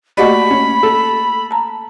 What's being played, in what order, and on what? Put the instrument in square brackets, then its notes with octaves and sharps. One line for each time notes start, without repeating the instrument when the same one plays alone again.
[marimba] A3 A#3 D#5 [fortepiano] F#4 G4 D5 [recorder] B5
[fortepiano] C#4
A4
[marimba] A5 A#5